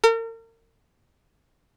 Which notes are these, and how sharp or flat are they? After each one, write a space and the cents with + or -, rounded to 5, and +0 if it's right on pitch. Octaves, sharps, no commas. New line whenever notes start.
A#4 -40